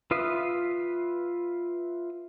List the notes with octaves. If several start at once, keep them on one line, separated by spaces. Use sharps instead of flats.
F4 B4 E5 F5 D#6